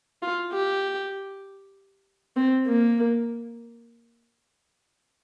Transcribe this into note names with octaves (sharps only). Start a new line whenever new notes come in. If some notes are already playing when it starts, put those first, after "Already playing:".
F4
G4
C4
A#3